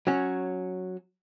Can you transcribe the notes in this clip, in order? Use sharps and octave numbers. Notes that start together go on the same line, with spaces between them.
F#3 C#4